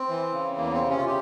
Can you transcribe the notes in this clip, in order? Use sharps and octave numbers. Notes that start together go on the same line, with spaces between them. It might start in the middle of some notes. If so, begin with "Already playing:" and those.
Already playing: C4
E3
C#3
E2 A#3
C4
C3
C#4
F4
C#3 G4